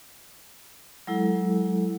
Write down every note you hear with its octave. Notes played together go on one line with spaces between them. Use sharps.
F#3 G#3 E4 A4